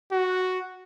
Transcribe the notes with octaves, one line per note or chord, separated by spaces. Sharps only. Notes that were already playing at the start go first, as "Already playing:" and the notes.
F#4